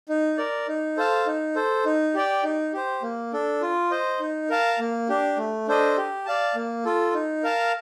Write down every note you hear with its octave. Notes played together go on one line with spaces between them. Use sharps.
D#4
A#4 D5
D#4
A4 C5 F5 A5
D#4
A4 C5
D#4
G4 D5 G5
D#4
G4 C5
A#3
D4 A4
F4
C5 D#5
D#4
A#4 F5 A5
A#3
D4 G4
A3
D4 A4 C5 D#5
G4
D5 F5 A5
A#3
F4 A4
D#4
A#4 F5 A5